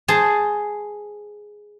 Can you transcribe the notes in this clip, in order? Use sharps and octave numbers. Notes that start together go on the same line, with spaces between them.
G#4 C5 A5